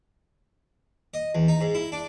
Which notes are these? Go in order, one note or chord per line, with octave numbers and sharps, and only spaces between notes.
D#5
E2
D#4
G#2
E4
D4